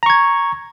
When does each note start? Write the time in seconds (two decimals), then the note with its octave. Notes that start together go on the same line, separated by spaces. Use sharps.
0.03 A#5
0.06 C#6
0.10 G#6